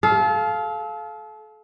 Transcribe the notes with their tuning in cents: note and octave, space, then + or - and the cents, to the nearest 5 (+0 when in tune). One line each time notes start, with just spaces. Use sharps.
A4 -35 F5 +0